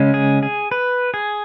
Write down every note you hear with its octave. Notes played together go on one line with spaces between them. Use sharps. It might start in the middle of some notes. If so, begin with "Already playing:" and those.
Already playing: C#3 G#3 C#4
G#4
G#4
B4
G#4